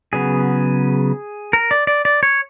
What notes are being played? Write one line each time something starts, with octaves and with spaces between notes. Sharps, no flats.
C#3 F#3 B3 G#4
A#4
D5
D5
D5
C#5